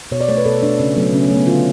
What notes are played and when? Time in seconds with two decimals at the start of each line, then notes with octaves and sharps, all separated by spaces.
0.12 B2 C#5
0.21 D5
0.29 A3 C#5
0.37 B4
0.45 B2 A4
0.62 A3 D4
0.80 C#3 C#4
0.96 F#3 A3 B3
1.13 C#3 C#4
1.24 C#4
1.30 F#3 A3
1.36 B3
1.47 D3 F4